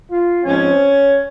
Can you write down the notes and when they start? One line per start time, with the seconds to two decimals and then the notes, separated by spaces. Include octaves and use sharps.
0.10 F4
0.45 G#2 F3 C4 C#4